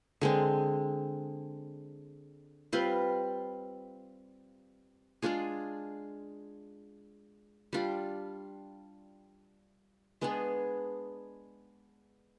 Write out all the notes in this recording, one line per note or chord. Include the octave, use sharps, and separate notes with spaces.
D3 G#3 C4
G3 C4 F4 B4
G#3 D4 F4 G#4
G3 D4 F4
G#3 B3 D4 G#4